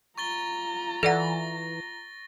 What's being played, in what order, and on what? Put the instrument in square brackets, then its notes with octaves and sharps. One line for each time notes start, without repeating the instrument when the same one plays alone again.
[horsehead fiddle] F4 A#5 [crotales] C#6 A6 G7
[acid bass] E3 [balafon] A4 D5 F#5 [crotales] A#6